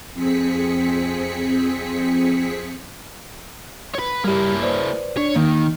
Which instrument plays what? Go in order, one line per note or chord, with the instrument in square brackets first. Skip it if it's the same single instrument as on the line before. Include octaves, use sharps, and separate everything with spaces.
[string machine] F2 C4 G#4 B6 C#7
[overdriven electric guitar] B4 C#5
[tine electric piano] G3 G4 [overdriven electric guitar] A#3 E4
[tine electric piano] B4 C5 D5
[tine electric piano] D4 D5 [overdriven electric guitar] C#5
[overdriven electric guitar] D#3 [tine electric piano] A#3